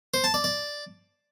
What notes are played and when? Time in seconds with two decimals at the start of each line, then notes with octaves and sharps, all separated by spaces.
0.14 C5
0.24 A5
0.34 D5
0.44 D5